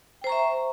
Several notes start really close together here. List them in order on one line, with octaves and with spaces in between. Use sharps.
G5 C5 A#5 C#6 E5